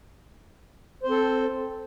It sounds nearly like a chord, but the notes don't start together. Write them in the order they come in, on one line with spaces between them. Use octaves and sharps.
C5 C4 A4